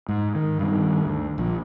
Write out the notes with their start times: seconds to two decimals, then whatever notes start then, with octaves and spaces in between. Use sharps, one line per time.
0.08 G#2
0.35 D#3
0.59 G2 D#3
1.05 D2
1.38 A#1 F3